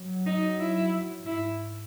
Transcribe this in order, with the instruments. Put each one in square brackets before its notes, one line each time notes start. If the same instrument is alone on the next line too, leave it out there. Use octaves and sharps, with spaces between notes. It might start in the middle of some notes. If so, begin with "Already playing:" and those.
Already playing: [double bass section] F#3
[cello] D#4
E4
[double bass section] F#3
[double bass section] G#2 [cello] E4